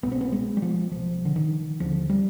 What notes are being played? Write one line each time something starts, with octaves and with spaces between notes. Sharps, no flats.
C2 B2 B3
C4
B3
G#3
G3
F3
C2 B2 F3
D3
D#3
D#2 D3 F3
G3